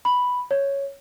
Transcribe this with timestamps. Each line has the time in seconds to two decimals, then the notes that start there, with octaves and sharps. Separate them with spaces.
0.05 B5
0.51 C#5